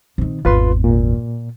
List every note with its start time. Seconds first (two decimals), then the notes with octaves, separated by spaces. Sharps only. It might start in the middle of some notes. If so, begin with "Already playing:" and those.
0.18 C3 D#3
0.45 G#1 E2 F4 B4 C6
0.84 A#2